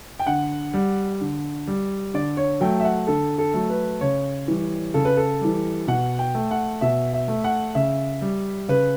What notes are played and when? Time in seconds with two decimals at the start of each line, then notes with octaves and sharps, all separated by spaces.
0.19 G5
0.26 D3 F#5
0.74 G3
1.21 D3
1.68 G3
2.14 D3 D5
2.37 C#5
2.61 F#3 A3 G5
2.80 E5
2.85 F#5
3.07 D3 A4
3.38 A4
3.54 F#3 A3
3.70 B4
4.01 C#3 C#5
4.48 E3 G3
4.94 C#3 A4
5.05 B4
5.17 A4
5.41 E3 G3
5.87 B2 F#5
6.19 G5
6.35 A3
6.51 F#5
6.81 B2 E5
7.13 E5
7.28 A3
7.44 F#5
7.75 C#3 E5
8.22 G3
8.68 C#3 B4